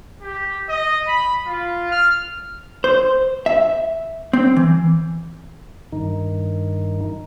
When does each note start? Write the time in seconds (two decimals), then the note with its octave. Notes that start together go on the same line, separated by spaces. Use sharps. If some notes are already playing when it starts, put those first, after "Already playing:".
0.22 G4
0.69 D#5
1.08 B5
1.47 F4
1.92 F6
2.84 C5
3.46 E5
4.33 C4
4.56 E3
5.92 G2 D#3 D#4